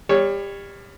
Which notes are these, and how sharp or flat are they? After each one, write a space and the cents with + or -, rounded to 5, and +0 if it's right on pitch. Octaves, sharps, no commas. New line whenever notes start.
G3 +25 C#5 +0